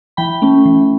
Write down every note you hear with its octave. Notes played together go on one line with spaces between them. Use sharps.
E3 G5 B5
A3 C#4
E3